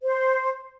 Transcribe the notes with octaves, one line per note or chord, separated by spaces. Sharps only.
C5